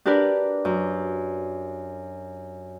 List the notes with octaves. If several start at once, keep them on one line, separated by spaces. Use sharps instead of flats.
D4 G4 A#4 B4 D5
F#2